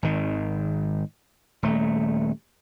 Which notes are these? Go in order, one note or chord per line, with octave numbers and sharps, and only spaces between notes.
G#1 D#3
D#1 A3